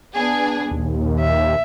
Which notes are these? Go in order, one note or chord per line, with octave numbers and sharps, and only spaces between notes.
B3 D4 G#4
A#1 D#2
E5